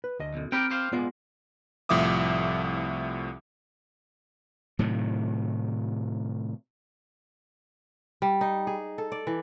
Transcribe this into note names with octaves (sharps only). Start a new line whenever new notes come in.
B4
D2 D#5
B1 F#2
C4 G4 A#4 G5 B5
G4 C5 F5
A#2 G#3 B3 F4 D5
C2 A2 F3 E5 D6 D#6
A2 C3 D#3 F#3
G3
D#4
G#4
A4
D5
E3